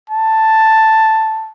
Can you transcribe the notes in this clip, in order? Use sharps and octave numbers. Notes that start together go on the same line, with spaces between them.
A5